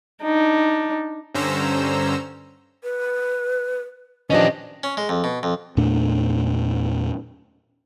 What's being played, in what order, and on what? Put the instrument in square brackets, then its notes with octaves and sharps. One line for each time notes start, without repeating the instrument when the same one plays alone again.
[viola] D4 D#4
[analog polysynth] G2 D3 C#4 C5 A#5 E6
[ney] B4
[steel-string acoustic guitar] D#3 F3 D4 [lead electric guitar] C#4 G4 [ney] B4 [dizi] D#5
[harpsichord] C#4
G#3
F2
B2
F2
[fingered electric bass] E2 A#2 A3 D4